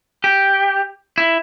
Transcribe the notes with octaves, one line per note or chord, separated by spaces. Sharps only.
G4
E4